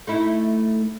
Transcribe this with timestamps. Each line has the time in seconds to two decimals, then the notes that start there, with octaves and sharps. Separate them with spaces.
0.07 A3 D#4 E4